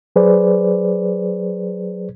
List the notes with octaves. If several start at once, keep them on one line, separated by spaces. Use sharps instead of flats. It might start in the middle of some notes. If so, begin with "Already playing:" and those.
F#3 G#4 B4 C5 D5